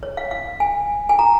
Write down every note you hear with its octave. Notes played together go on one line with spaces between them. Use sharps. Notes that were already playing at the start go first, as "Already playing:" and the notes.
C#5
F5
F5
G#5
G#5
A#5